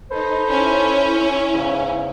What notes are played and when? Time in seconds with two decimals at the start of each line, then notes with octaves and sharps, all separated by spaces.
0.11 D#4 A4 B4 C5
0.50 C#4 E4
1.54 E2 G#2 C#3